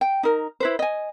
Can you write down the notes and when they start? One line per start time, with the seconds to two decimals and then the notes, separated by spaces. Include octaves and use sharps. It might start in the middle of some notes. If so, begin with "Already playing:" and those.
0.01 G5
0.23 D#4 A#4
0.60 E4 B4 C5
0.79 D#5 G#5